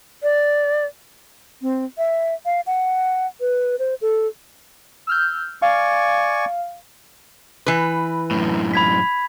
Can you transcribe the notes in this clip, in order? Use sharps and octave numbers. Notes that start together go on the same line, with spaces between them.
D5
C4
E5
F5
F#5
B4
C5
A4
E6 F6 G6
D5 F5 G#5 C#6
E3 B4
F#2 A2
B5 G#6 B6